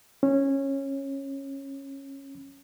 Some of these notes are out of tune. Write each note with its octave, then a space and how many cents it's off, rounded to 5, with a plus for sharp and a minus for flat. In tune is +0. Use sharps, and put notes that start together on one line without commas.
C#4 -15